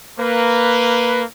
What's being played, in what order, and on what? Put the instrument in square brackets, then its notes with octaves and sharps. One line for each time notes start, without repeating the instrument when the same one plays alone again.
[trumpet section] A#3 B4